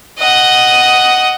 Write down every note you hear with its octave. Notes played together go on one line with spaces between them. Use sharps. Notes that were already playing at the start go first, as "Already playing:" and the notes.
D#5 F#5